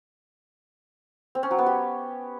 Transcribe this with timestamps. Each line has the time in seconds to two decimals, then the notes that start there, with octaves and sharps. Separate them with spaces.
1.35 C4
1.43 C#4
1.51 F#3
1.59 B3
1.66 G4